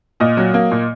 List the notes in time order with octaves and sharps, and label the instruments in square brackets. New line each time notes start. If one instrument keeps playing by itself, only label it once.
[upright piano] A#2 D#5
F#3
A#3
A#2